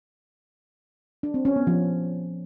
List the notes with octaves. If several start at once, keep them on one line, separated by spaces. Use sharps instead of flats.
D4
C4
C#4
B3
F3